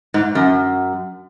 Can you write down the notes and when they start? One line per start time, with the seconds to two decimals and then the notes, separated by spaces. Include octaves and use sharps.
0.14 G#2
0.35 F#2